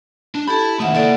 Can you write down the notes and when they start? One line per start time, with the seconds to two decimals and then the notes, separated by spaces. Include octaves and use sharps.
0.35 D4
0.48 E4 G4 A4 A5 B5
0.80 D#3 A3 D#4 E5 F#5
0.95 A#3 E4 A4 D5 F#5